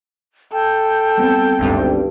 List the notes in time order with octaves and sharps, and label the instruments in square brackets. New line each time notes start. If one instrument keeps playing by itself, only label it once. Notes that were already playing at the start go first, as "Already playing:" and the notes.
[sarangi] A4 [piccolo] G5
[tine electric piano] G3 B3 C4
[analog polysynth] G#1 D2 G2